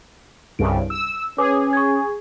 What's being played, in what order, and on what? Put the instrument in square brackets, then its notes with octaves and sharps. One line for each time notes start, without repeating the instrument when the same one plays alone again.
[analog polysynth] C2 G2 C#3 [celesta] D7
[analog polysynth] E6
[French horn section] C#4 [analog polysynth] G#4 [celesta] B4 C#5 D6
[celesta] C#6 G#6